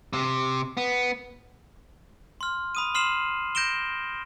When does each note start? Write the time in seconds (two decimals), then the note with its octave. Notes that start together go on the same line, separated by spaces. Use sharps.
0.13 C3
0.77 B3
2.41 C6 F6
2.75 B5 D#6 D#7
2.95 C6 F6 C7 E7 F#7
3.55 G6 A#6 D7 E7 G7